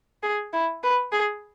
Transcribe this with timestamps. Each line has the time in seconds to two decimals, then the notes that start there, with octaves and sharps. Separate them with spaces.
0.23 G#4
0.53 E4
0.83 B4
1.12 G#4